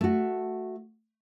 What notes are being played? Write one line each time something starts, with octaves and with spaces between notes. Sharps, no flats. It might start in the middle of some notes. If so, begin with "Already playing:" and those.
A3 F#4